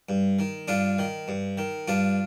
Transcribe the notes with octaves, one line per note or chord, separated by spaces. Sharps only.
G2
D#3
G2 D4 F4
D#3
G2
D#3
G2 D4 F4